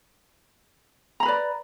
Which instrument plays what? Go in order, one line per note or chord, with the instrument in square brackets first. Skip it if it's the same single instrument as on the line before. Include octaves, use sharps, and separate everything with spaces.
[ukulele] A#5
B5
B4
D5